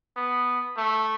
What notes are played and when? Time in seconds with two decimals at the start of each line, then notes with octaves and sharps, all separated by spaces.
0.16 B3
0.77 A3